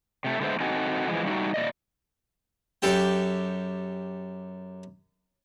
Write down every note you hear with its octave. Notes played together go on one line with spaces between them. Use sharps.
C3 A3
D3 G#3 B3 C5 E5
C4 D#4 F#4 A4 G#5
E3 F3 G#3
G3 A3 D#4 F#4
A#2 D5 D#5
F#2 G4 A4 G5